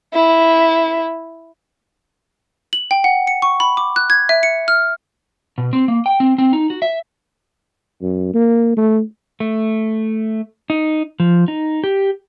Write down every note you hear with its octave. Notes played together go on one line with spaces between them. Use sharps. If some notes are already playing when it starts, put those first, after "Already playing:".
E4
F#7
G5
F#5
C#7
C#6
B5
D6
F#6
G#6
E5
C#7
F6
B2
C4
A#3
G5
C4
C4
D#4
F#4
E5
F#2
A#3
A3
A3
D#4
F3
D#4
G4